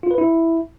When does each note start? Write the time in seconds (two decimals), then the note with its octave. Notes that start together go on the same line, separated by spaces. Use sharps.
0.03 F4
0.11 B4
0.18 E4